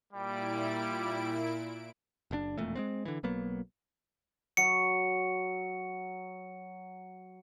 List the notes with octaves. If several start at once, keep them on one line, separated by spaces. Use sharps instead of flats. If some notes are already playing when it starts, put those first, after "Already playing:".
A#2 G3 E4 D7
F#1 C#3 D4
E1 F2 A#2 A3
G#3 B3 C4
D3 E3
B1 F#3 A#3 B3
F#3 C#7